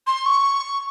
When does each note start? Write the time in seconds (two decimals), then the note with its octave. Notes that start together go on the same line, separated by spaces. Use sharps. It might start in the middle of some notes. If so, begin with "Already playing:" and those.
0.07 C6
0.26 C#6